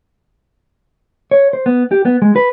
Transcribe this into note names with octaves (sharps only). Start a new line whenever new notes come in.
C#5
C5
B3
G4
B3
G#3
B4